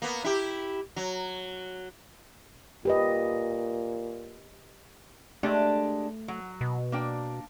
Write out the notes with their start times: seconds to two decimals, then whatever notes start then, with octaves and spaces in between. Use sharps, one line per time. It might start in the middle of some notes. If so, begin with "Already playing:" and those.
0.02 A#3 B3
0.24 E4 G4
0.96 F#3
2.85 A#2 G4 B4 D#5
5.43 G#3 A3 D4 G4
6.28 F#3
6.61 B2
6.92 A#3 D4 G5